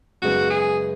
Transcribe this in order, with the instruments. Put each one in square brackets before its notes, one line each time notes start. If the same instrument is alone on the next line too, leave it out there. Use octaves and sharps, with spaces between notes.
[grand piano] F#2 C#3 G#3 B3 [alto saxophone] F#4
[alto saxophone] G#4